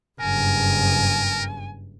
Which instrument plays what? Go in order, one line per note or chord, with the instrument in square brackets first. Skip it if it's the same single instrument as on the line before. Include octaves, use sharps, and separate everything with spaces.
[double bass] F#1 G2 [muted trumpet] A#4 [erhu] G#5